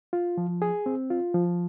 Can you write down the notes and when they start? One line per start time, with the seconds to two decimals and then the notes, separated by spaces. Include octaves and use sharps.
0.13 F4
0.38 F3
0.62 G#4
0.86 C4
1.10 F4
1.34 F3